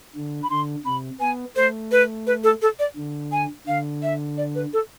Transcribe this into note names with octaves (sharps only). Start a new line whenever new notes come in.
D3
B5
D3 C6
C3 B5
B3 G#5
A3 C5
B4
B4
A4
A4
D5
D3
G#5
D3 F5
E5
D5
B4
A4